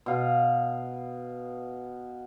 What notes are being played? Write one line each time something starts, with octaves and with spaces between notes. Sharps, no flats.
B2 F5